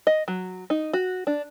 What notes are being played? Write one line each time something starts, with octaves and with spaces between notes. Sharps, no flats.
D#5
F#3
D#4
F#4
D4